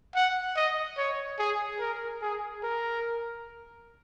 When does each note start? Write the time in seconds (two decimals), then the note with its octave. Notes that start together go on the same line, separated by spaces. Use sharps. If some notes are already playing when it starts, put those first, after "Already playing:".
0.15 F#5
0.56 D#5
0.97 C#5
1.39 G#4
1.80 A#4
2.22 G#4
2.63 A#4